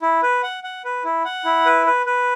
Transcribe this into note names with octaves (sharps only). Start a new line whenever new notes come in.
E4
B4
F#5
F#5
B4
E4
F#5
E4
B4
B4
B4